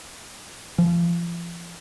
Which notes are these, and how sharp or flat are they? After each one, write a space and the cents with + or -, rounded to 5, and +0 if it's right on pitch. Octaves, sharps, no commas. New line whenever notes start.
F3 -30